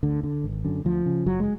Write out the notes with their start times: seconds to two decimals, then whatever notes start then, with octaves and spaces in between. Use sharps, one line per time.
0.03 D2 D3
0.24 D3
0.44 G#1
0.65 F#2 D3
0.85 D2 F3
1.06 C#3
1.26 F#1 F#3
1.40 G#3